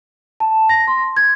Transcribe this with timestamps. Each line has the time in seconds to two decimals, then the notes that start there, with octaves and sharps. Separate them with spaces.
0.40 A5
0.69 A#6
0.87 C6
1.17 G#6